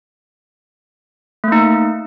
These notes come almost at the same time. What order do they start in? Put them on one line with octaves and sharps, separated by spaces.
A3 A#3 D#4